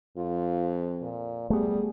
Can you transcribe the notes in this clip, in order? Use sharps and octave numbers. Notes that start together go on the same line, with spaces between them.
F2 F4
A#2
G3 A3 B3 G#4